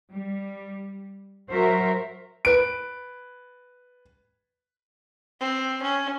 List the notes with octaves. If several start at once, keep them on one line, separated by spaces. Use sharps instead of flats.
G3
F#3 F#4 A#4 C5 E5
B4 D7
C4
C#4